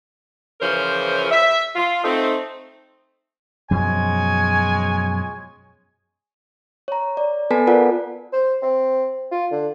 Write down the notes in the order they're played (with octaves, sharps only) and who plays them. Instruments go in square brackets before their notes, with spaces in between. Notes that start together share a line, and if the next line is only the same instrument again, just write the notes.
[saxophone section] C#3 E3 F3 C#4 A#4 C5
E5
F4
A3 C4 D#4
[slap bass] F#2 B2 F3 [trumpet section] G#3 C#5 G#5
[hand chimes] C#5 A#5
D5
B3 A4 B4 G#5 A5 B6
F4 A#4 B4 D5 F#5
[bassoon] C5
C4
F4
D3